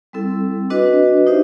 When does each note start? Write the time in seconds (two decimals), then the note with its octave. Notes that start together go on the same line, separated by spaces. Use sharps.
0.13 G3 C4 E4 A4
0.70 D4 F#4 B4 D#5
1.26 D#4 G4 C5 E5